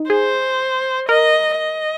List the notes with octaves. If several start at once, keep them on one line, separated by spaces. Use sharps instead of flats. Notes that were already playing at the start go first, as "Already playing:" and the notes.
Already playing: D#4
G#4 C5
A#4 D#5
D#5